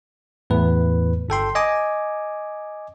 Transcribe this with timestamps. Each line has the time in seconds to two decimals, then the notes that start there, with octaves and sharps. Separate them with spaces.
0.50 E2 A2 B4
1.29 G1 A4 G5 C6
1.55 D#5 G#5 D6